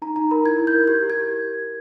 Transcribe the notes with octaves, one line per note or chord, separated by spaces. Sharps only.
D#4 A#5
D#4 A#5
A#4 B5
E4 G#6
E4
G6
A#4
G4 G6
G4
G#6